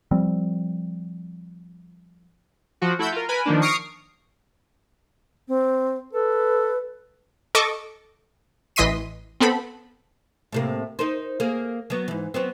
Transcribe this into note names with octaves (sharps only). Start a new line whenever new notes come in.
F3 G3 C4
F3 F#4
A3 E4 F#4 B5 E6 G6
F4 A#4
A#4 B4 G#5 B5
D#3 F3 A#3 D4
C#6 D#6 F6 A#6 C7 D7
C4
A4 B4
A4 D#5 C#6 D6
A1 E3 D#5 C6 B6 D#7
B3 C4 A4 B5
A2 C3 A#3
D#4 A#4 C5
A#3 G#4
F#3 B3
G#2 E3
F#3 B3 C4